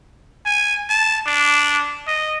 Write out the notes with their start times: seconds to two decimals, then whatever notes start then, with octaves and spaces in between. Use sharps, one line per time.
0.45 G#5
0.90 A5
1.26 D4
2.07 D#5